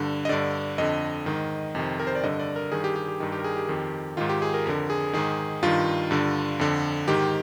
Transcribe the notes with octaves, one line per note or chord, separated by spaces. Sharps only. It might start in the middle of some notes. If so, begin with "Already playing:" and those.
Already playing: G2 D3
D#5
G2 D3 D5
F2 D3 D#5
G#2 D#3
F2 C3 D#3
A#4
C5
D5
G2 D3 D#5
D5
A#4
G2 D#3 G#4
G4
G4
G4
G2 D#3
G4
A#4
G#4
G4
F2 D#3
G#2 D#3 F4
G4
G#4
A#4
F2 D3 A#4
G#4
G#2 D#3 G#4
G2 D#3 F4
G2 D3
F2 D3
G#2 D#3 G4